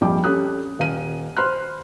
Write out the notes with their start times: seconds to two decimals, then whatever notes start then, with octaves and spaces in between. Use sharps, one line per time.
0.01 A#1 F2 G3 G5 D6
0.24 C#4 G4 A4 D#6 F#6
0.79 D#1 F5 D#7
1.37 C5 B5 C6 F6 F#6